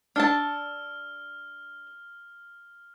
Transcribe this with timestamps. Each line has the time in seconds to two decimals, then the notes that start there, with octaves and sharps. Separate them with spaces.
0.16 D4 A4 A5 F6